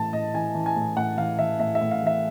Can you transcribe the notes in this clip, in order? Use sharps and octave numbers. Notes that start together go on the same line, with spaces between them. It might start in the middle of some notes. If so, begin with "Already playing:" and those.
Already playing: A2 E3 A5
A2 D#5
E3 G#5
E3
G#5
A2
A2 F#5
E3 F5
E3 E5
A2 E5
E5
A2
F5
E3 E5